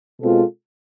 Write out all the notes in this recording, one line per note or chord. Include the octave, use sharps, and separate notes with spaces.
B2 G#3 C4 F4 A4